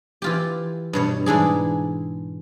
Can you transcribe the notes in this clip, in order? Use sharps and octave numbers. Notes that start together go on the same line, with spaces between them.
E3 F4 G4
G2 B2 C#5
G#2 E3 D4 G#4